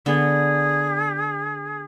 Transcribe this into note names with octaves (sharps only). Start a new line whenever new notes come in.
D3 B3 G#4